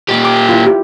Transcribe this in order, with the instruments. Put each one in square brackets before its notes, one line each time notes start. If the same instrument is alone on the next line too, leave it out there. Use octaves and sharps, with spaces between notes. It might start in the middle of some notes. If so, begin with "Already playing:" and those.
[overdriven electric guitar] A#2 G4
[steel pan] D6
E4 F4
G4